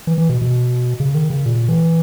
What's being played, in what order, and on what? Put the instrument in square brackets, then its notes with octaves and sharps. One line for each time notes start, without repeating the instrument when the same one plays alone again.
[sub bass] E3
E3
B2
B2
C#3
D#3
C#3
A#2
E3